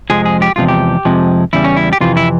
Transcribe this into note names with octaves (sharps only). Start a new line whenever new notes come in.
F2 C3 F3 G#3 G#4
G#4
G4
E2 C3 F3 G#3 F4
G4
F2 C3 F3 G#3
E2 C#3 G3 E4
C#4
E4
G4
F2 C3 E3 F4
E4